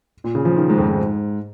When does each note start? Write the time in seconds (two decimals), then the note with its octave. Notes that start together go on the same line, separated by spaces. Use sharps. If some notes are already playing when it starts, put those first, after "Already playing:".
0.24 A#2
0.35 C#3
0.45 F3
0.56 D#3
0.69 G#2
0.77 F2
0.88 G#2